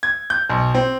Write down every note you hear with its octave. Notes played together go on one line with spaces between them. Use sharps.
G#6
G6
B1
C4